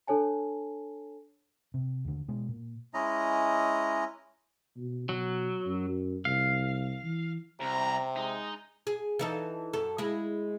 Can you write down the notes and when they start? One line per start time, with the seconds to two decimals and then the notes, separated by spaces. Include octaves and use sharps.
0.07 D4 A4 C#5 G#5 A5
1.74 C3
2.05 D#2 D3
2.28 B2 G#3
2.48 A#2
2.94 G#3 C#4 E4 D#5 A#5
4.77 B2
5.09 B2 F#3
5.66 F#2
6.25 C2 F5
7.04 E3
7.60 C2 C3 A#5
8.16 G#3 D#4
8.87 G#4
9.19 E3 D#4 A4
9.74 F#2 A4
9.98 G#3 E4